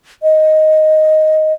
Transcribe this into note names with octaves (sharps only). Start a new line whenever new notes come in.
D#5